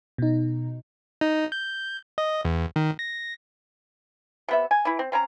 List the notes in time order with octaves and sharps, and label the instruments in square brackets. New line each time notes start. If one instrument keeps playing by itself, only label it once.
[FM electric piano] B2 D#4
[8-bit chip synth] D#4
G6
D#5
E2
D#3
A#6
[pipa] C3 B3 E5
G#5
E3 E4
C4
C4 C#4 A#4 A#5